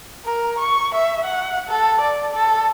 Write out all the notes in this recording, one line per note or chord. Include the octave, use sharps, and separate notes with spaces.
A#4
C#6
E5
F#5
A4
D5
A4